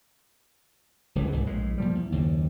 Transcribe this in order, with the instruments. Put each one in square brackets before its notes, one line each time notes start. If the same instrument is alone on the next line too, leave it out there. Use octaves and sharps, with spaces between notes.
[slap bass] D1 C#2 A2 E3
C2 G#2 B2
A#1 E2 A2 G#3
A#2 F3 G3
E2
F#1 D#2